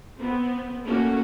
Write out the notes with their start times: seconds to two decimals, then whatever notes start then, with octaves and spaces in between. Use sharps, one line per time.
0.18 B3 C4
0.86 A3 A#3 C#4 F#4